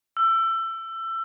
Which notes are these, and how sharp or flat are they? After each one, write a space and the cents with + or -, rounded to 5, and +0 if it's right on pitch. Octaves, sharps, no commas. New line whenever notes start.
E6 +25